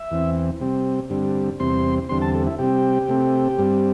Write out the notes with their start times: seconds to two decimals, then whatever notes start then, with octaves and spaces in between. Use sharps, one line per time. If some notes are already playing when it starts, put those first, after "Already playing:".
Already playing: E5
0.11 E2 E3 C4
0.61 C3 G3 C4
1.10 G2 D3 G3 C4
1.60 E2 C3 G3 C4 C6
2.09 E2 D3 G3 C4 C6
2.22 A5
2.34 A4
2.47 E4
2.59 C3 G3 C4 G4
3.08 C3 A3 C4
3.58 G2 G3 C4